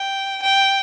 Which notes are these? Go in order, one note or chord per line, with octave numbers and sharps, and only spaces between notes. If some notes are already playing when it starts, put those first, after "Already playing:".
Already playing: G5
G5